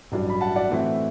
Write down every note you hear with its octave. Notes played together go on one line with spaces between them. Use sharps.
A1 G2 F#3
B5
F#5 A5
D5 F#5
A2 E3 A3 C4 E4